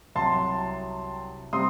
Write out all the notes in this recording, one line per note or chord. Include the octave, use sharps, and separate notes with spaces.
C2 C3 F#3 A5 C6
C3 G3 C4 C6 D#6